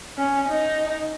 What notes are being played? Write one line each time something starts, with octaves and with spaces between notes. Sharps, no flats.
C#4
D#4